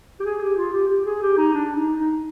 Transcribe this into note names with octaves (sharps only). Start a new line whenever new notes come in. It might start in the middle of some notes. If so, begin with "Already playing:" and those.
G4
G#4
G4
F4
G4
G4
G#4
G4
D#4
D4
D#4
D#4